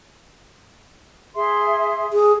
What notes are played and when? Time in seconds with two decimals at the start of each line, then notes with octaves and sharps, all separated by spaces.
1.36 G#4 E5 C6
2.13 G#4